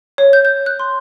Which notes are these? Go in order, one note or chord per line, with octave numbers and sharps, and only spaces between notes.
C#5
G6
G6
F#6
C6